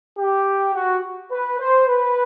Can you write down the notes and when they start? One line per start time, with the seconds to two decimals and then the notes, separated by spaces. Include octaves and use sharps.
0.18 G4
0.74 F#4
1.30 B4
1.59 C5
1.87 B4